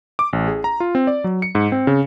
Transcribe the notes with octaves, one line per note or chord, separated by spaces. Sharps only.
D6
A1
G#4
A#5
F4
C4
D5
F#3
C#7
G#2
C4
C#3